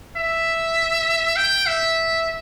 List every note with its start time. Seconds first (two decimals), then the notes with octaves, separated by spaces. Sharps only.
0.16 E5
1.36 G5
1.66 E5